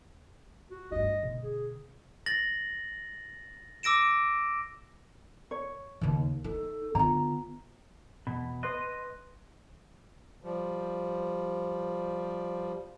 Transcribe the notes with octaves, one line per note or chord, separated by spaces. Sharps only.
F#4
G2 D#4 D#5
B2 D3
G#4
A6 A#6 F#7
D6 E6 A#6 D7 E7
C#5
D#2 C#3
D#4 A4
D3 B3 F4 A#5
E2 B2 B5
B4 D#5 C6 F#6
F3 G3